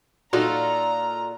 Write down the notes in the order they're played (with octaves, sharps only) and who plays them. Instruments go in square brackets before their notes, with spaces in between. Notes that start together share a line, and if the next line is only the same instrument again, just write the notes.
[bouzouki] A#2 F4 A4 [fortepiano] D#4 F#4 [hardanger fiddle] A#5